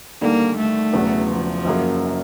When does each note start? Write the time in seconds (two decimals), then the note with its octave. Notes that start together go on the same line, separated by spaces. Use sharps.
0.21 D#2 D3 G3 A#3
0.57 A3
0.93 E1 E2 C#3 F#3 B3
1.29 F3
1.65 F#1 F#2 C#3 F#3 A#3